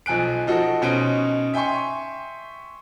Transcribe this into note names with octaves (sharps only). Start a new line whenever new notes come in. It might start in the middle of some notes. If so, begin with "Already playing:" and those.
B1 F3 G#5 F#6 D7
F3 D#4 F#4 A4
B2 C#4 D#4 C5 D7
E5 G5 G#5 C6 C#6